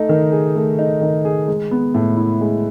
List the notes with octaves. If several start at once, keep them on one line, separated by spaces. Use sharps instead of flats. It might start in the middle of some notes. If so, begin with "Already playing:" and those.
Already playing: A3 D#4
D#3
G#4
A3
D#4
D#3
G#4
G#3
B3
A2
E4
G#3